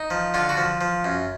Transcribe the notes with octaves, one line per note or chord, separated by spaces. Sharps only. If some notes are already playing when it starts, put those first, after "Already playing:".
Already playing: D#4
F3
D3 F4
F#4
F3
F3
F#2